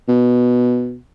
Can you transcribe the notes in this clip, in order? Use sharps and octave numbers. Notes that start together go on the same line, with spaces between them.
B2